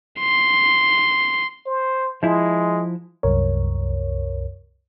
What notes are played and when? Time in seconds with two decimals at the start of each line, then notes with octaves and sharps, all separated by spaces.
0.20 C6
1.66 C5
2.23 F3 G#3 E4
3.23 C2 F#2 A#4 C#5